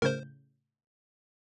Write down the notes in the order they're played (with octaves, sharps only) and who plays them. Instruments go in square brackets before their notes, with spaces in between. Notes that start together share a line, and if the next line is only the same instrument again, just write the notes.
[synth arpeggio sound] A2 C#3 G6 [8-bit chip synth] A#4 C5